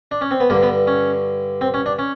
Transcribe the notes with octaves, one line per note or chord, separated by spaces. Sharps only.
D4
C#4
C4
B3
G2 D3 A#3
B3
C#4
C4
C#4
D4
C#4